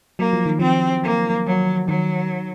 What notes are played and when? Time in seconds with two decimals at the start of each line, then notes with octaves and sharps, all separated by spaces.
0.19 F#3 A#3
0.33 F3
0.46 D#3
0.59 F3 C4
1.03 A#3
1.47 F#3
1.88 D#3 F#3